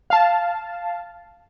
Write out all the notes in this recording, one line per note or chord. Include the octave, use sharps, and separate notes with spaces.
F5 A5